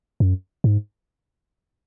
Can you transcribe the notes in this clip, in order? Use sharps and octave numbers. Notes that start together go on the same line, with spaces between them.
F#2
G#2